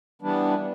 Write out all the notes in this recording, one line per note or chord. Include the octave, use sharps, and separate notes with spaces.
E3 G3 B3 D4